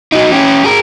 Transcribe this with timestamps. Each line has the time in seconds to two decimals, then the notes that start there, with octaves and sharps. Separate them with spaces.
0.13 F#3 D#4
0.32 C#4 G4
0.65 G#4 A#4